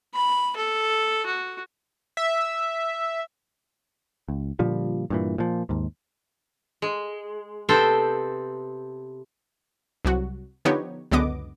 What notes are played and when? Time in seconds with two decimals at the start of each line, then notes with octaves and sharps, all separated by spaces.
0.14 B5
0.56 A4
1.26 F#4
2.17 E5
4.29 C#2
4.59 A#2 D3 F3 G3
5.10 G2 A#2 E3
5.38 A#2 F3
5.69 D#2 G#2
6.82 G#3
7.69 C3 B3 A4 C5 G5
10.05 C2 F#3 F#4
10.65 D3 F3 B3 D#4 G4 C#5
11.11 C#2 F#2 D3 B3 D#5 D6